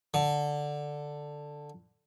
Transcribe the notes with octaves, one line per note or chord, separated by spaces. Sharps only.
D3